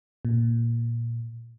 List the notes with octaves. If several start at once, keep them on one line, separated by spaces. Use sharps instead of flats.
A#2